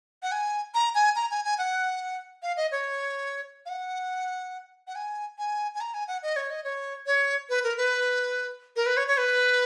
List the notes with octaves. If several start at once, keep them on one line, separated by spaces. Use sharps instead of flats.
F#5
G#5
A#5
G#5
A#5
G#5
G#5
F#5
F5
D#5
C#5
F5
F#5
F#5
G#5
G#5
G#5
A#5
G#5
F#5
D#5
C#5
D#5
C#5
C#5
B4
A#4
B4
A#4
B4
C#5
C#5
B4